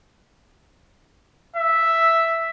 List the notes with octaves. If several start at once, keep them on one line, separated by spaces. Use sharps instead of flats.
E5